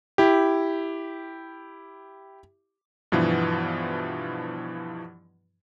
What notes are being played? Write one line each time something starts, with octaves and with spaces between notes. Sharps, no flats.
E4 G4
G2 B2 E3 F3